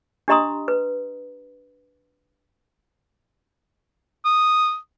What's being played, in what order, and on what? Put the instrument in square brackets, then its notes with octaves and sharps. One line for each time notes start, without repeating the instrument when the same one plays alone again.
[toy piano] D4 G4 D#5 A#5 C6 D#6
B4
[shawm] D#6